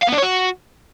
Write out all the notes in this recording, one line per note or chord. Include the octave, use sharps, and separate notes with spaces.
F5
B3
D4
C#5
F#4